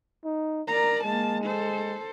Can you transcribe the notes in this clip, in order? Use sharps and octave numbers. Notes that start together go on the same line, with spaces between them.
D#4
A#4 D5 A#5
G#3 A#3 A5
A4 C5